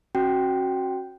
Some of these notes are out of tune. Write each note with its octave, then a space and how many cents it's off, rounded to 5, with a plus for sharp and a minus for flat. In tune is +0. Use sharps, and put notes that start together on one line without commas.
C#4 -40 F#4 +0 G5 +0